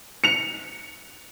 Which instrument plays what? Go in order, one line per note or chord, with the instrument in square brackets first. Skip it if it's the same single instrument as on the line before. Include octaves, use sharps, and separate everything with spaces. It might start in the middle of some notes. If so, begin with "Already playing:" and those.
[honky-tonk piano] C#7 F7